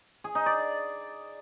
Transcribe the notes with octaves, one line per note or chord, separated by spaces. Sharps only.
G#4
D#4
D5